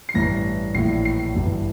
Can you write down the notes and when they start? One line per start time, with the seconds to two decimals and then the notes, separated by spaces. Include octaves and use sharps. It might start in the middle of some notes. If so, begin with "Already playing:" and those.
0.09 C7
0.14 A1 G2 E3 A#6
0.74 A#1 A2 E3 C7
1.05 C7
1.35 G1 G2 E3